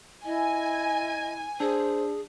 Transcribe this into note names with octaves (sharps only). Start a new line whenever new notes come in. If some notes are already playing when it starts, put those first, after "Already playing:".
E4 D#5 G#5
D4 G#4 C5